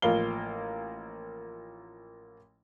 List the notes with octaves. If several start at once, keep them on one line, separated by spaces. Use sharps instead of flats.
A1 F3 A#3 F5 G7